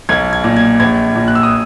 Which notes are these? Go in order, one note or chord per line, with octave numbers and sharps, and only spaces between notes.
B1 G#6
G#6
A#2
G#6
A#1 G#6
A#2
F#6
E6
D#6